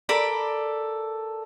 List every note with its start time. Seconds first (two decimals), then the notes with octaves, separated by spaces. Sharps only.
0.09 A4 A#4 D5 B5